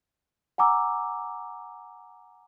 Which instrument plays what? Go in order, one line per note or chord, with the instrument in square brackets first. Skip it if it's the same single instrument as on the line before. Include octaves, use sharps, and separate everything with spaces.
[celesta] F#5 G#5 A#5 D6 E6